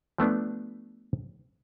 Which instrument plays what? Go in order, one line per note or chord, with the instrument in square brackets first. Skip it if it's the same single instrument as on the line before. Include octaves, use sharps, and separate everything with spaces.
[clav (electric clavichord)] F3 A3 B3 D4